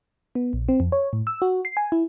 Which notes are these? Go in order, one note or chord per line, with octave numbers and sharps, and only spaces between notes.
B3
A#1
C4
F2
C#5
A2
E6
F#4
C7
G#5
E4